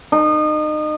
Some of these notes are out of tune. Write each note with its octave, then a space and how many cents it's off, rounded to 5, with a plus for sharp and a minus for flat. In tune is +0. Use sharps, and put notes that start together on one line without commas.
D#4 -30